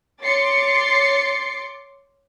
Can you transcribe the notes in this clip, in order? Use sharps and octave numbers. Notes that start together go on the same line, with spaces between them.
C#5 C6 D6 A6 C7 C#7